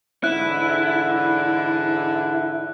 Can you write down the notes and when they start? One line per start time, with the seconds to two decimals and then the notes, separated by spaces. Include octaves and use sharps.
0.24 G#2 D3 E3 E4 F#6